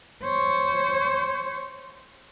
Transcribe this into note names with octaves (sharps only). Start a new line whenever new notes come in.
C5 C#5